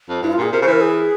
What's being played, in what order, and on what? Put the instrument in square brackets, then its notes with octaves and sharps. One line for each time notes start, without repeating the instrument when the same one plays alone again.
[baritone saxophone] F2
[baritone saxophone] G2 [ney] E4
[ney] F4
[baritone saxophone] A#2 [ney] G#4
[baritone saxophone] C3 [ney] A#4
[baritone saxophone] C#3 [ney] C5
[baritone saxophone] E3 [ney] A#4
[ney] G#4